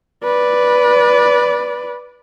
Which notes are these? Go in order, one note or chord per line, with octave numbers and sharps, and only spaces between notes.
B4 D5